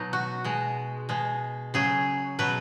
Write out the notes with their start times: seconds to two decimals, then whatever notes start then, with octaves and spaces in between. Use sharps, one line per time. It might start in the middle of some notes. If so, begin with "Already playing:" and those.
Already playing: B2 F#3 D#4
0.13 F#4
0.44 B2 G#3
1.09 B2 G#3
1.74 C#3 F#3 G#4
2.39 B2 F#3 B4